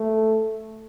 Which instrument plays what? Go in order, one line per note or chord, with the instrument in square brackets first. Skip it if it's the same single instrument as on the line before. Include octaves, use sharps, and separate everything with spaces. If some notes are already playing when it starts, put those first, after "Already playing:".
Already playing: [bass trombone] A3